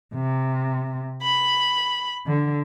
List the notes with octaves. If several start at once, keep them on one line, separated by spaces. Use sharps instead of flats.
C3
B5
D3